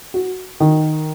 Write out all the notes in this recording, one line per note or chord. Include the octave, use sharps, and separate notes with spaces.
F#4
D#3